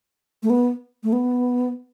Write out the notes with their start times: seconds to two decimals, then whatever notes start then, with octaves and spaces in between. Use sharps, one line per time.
0.43 A3
0.50 B3
1.04 A3
1.13 B3